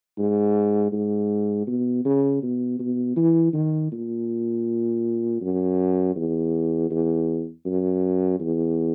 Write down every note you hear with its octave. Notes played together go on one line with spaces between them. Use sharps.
G#2
G#2
B2
C#3
B2
B2
E3
D#3
A#2
F#2
E2
E2
F#2
E2